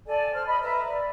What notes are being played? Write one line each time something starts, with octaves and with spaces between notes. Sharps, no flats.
A4 D5 G#5
C5 F6
D#5 B5
B4 E5 A#5
D5